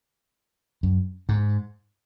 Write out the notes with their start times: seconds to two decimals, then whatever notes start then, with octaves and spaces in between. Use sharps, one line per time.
0.83 F#2
1.29 G#2